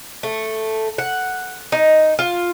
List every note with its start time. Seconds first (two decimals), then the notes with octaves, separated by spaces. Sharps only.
0.23 A3
0.98 F#5
1.72 D#4
2.19 F4